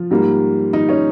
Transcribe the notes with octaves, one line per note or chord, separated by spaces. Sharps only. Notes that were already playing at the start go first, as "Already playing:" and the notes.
Already playing: F3 F4
G#2 G3 A#3
D#3 D#4
C#4